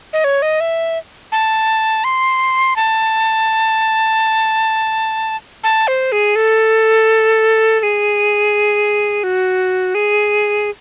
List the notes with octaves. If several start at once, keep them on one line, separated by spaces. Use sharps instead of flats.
D#5
C#5
D#5
E5
A5
C6
A5
A5
C5
G#4
A4
A4
G#4
F#4
G#4